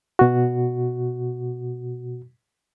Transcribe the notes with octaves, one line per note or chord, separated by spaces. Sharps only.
B2 F#4